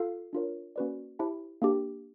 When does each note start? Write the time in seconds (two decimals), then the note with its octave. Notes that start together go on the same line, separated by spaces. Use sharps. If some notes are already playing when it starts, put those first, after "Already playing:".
Already playing: F4 A4 F5
0.33 D4 F4 A#4 C#5
0.76 A#3 C#4 F#4 B4 D5
1.19 E4 G4 C5 E5 A5
1.62 A#3 D4 G4